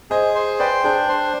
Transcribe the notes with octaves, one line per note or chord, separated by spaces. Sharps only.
G#4 C5 D#5
C5
B4 D5 G5
D4 G#4 C5
C5